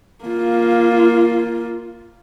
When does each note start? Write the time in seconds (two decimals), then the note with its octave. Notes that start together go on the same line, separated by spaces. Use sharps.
0.24 A#3 F4